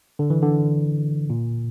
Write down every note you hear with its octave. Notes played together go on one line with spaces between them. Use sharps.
D3
E3
D3
A#2